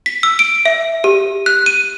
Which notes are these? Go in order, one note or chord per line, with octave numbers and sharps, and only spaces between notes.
B6
E6
D7
E5
G4
F#6
D#7